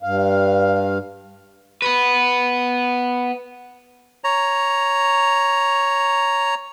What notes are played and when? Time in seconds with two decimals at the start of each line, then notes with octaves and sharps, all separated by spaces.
0.03 G2 F5
1.82 B3 B4
4.24 C#5 A#5